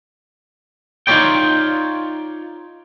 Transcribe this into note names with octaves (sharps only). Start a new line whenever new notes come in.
D#4 F4 G#4 C#5 D5 G5